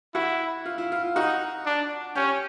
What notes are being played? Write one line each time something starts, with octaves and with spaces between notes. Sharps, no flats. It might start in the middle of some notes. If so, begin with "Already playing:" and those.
E4 F#4
F4
E4
F4
D#4 F#4
D4
C#4 G4